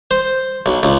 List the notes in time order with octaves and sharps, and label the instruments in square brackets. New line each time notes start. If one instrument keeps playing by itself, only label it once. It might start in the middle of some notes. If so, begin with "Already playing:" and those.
[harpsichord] C5
B1
C#2